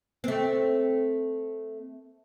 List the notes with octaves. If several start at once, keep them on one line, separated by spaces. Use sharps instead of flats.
A3 C4